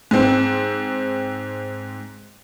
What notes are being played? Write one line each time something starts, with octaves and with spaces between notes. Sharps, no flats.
G#2 C4